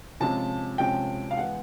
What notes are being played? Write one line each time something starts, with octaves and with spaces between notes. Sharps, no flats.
C3 F3 G#3 C#4 A5
C3 F3 G#3 C#4 G5
F5
E3 G#3 B3 F#5